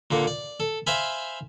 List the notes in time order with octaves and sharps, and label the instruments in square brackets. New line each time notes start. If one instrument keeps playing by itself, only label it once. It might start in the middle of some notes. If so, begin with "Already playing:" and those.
[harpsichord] A#2 D3 A#3
D5
A4
C5 E5 F5 G#5 B5